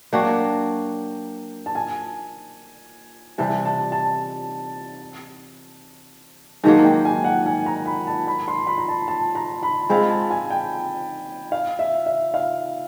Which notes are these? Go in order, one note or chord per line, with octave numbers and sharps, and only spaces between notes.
F#3 A#3 D4 F#4 G5
A5
G#5
C3 E3 G3 A5
A5
A5
G#2 D#3 F#3 A#3 A5
G5
G#5
F#5
G#5
A#5
B5
A5
B5
C6
B5
A#5
A5
A5
A#5
B5
G#3 C4 F4 B5
A5
G#5
G5
F5
E5
E5
F5